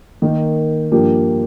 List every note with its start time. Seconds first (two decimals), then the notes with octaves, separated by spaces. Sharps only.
0.22 D#3 A#3 D#4
0.92 G2 F3 A#3 G4